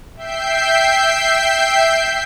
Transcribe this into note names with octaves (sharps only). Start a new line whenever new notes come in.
E5 G5 G6 C7